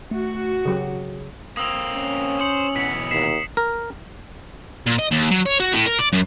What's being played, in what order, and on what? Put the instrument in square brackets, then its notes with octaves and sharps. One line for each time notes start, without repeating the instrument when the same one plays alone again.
[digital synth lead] A3 [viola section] F#4
[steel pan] C#3 F#3 G4 [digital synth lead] G#4
[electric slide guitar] A#3 C4 [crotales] D#6 E6 F7
[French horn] C#4
[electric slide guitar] C5 [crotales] D#6 C#7 F#7
[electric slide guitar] B2 E3 F#3 [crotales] B6 C#7
[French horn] D#2 [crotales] B6 C7 E7
[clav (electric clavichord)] A#4
[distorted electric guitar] A#2
D#5
D#2
F#3
C#5
F#4
A2
A#4
D5
F#2